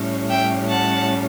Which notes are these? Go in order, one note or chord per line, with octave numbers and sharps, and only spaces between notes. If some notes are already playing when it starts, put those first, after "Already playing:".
Already playing: A2 G3 C#4
E5 G5
F#5 A5